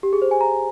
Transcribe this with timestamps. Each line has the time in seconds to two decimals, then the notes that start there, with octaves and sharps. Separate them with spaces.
0.03 G4
0.13 G#4
0.22 C5
0.31 G#5
0.41 A#5